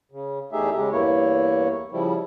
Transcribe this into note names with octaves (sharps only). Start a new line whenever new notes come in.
C#3
E2 A3 D#4 G4 G#4 E5
C#3 G#3 G4
E2 G2 A#3 E4 C#5
C#3 F3 G3 E4